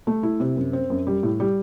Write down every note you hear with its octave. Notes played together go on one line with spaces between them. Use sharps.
A3
E4
C3
F#2
C4
F#2
G3
A2
G3